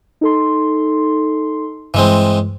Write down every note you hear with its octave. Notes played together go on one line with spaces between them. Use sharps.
D#4 A4 C6
G2 E3 G#3 C4